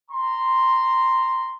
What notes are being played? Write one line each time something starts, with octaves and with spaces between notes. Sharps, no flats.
A#5 C6